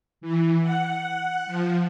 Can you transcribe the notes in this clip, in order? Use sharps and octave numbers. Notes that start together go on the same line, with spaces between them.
E3
F#5
F3